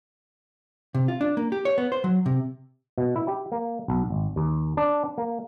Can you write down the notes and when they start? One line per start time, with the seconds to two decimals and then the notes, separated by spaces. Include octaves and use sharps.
0.95 C3
1.08 F4
1.21 D4
1.37 A#3
1.52 G4
1.65 C#5
1.78 B3
1.92 C5
2.04 F#3
2.26 C3
2.98 B2
3.16 E4
3.28 G4
3.52 A#3
3.88 B1
4.10 G#1
4.36 D#2
4.77 D4
5.18 A#3